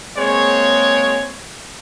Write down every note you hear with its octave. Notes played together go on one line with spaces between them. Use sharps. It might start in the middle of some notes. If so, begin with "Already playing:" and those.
G#3 A#3 C4 G#4 C#5